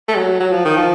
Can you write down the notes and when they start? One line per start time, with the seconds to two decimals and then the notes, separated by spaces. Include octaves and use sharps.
0.08 A3
0.16 F#3
0.40 F#3
0.52 F3
0.65 D#3
0.76 F3